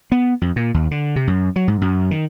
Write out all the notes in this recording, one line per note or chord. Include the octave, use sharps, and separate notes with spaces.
B3
F2
A#2
D#2
D3
C3
F#2
F#3
G#2
F#2
D#3